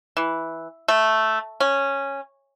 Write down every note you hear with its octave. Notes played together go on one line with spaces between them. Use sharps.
E3
A3
C#4